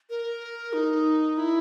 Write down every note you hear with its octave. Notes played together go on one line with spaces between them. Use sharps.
A#4
D#4
E4